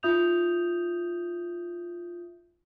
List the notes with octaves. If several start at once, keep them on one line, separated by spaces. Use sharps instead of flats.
D#4 F4 E5 D#6 G6 F7